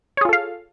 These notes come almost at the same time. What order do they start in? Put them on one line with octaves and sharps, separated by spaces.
C#5 G#4 F4 A4 F5